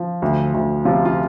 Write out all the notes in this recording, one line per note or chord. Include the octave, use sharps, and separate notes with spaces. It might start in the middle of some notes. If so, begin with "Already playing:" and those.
Already playing: F3
D2
D2
C3 F3 F4
F4